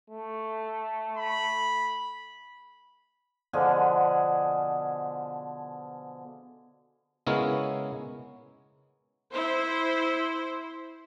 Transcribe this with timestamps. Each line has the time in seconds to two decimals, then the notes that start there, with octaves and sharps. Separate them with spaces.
0.10 A3
1.17 B5
3.53 B2 D3 F3 G#4
7.27 C#3 G#3 B3 E4 A#4 C#5
9.31 E4 C5